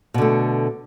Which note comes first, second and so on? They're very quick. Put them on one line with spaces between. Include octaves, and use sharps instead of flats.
B2 D3 A3